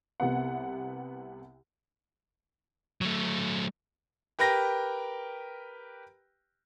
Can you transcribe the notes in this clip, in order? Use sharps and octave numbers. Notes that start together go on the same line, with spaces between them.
C2 C3 B3 F#5
F#3 A3
G4 A#4 B4 G5 A#6